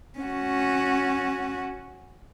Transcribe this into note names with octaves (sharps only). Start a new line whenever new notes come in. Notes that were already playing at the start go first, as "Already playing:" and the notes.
C#4 F#4